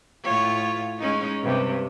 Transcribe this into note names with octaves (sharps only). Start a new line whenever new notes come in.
A2 F4 C#5
G#3 C#4 D#4
G2 C3